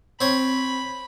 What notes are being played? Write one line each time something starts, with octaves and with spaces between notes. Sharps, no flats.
C4 C#5 B5